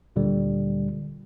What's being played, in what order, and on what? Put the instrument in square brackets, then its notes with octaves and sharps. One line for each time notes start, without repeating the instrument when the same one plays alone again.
[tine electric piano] D2 A#2 D3 G3